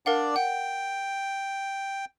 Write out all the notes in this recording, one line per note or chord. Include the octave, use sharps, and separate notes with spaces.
D4 A#4 D5 F5 F#5
F#5 G5